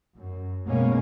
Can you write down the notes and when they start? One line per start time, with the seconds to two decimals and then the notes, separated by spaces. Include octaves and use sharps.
0.16 F#2
0.65 B2 G#3 A#3 C#4